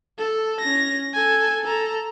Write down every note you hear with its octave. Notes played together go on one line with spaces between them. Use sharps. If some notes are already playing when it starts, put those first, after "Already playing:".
A4
C#4 A#6
A4 G#5
A4 A#5